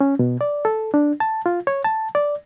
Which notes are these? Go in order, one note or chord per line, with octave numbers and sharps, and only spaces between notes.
C#4
B2
D5
A4
D4
A5
F4
C#5
A5
D5